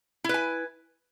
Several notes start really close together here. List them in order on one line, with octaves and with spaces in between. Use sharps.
E4 B4 G#5